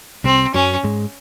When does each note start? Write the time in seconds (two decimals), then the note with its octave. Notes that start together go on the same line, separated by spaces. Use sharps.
0.24 C2 C3 C4
0.54 F#2 F#3 C#4
0.84 G#2 G#3